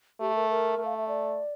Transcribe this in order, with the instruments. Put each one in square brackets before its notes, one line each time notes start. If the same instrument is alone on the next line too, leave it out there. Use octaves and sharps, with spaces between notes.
[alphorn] A3 [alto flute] G4
[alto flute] A#4
A#4
[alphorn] A3
[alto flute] F5
E5
D5